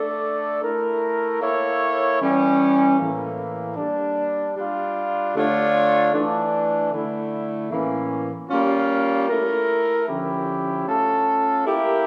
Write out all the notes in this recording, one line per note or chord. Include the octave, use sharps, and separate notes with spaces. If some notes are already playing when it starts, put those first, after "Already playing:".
Already playing: A3 D4 A4 D5
A3 E4 A#4
A#3 E4 A4 C#5
E3 G3 C#4
A2 E3 A#3
G3 A#3 D4
G3 D4 F4
D3 A3 D4 F4 C#5
E3 A3 D4
D3 A3 E4
A2 E3 A#3 C#4
G3 A#3 C#4 F4
A3 E4 A#4
D3 F3 C#4 E4 G4
A3 C#4 F4 A4
A#3 E4 G4 A#4